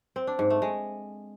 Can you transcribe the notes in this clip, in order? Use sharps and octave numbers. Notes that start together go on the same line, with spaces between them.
C4
D4
G#2
A3
G#3